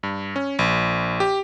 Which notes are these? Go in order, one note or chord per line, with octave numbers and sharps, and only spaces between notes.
G2
C#4
A#1
G4